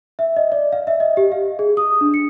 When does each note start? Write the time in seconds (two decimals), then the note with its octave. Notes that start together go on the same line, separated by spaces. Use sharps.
0.19 E5
0.37 D#5
0.52 D5
0.73 F5
0.87 E5
1.00 D#5
1.17 G4
1.32 F5
1.59 G#4
1.77 D#6
2.01 D4
2.14 C#7